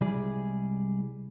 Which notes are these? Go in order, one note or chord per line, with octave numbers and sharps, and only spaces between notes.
C2 G3 G#3 E4 G#4 D5